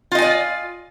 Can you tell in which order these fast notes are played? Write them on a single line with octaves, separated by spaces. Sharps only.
F4 D#5 G#5 D5